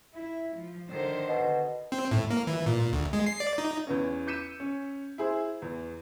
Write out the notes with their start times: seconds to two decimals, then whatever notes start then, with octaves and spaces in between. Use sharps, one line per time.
0.17 E4
0.56 F3
0.90 D3 D#3 C5
1.28 B2
1.92 C4
2.11 A2
2.30 A#3
2.47 E3
2.66 A#2
2.93 D2
3.13 G#3
3.26 C7
3.40 D5
3.58 D#4
3.87 E2 B3 C#4
4.27 D6 G6 B6 C#7 D#7 E7
4.60 C#4
5.18 E4 G#4 C5
5.62 E2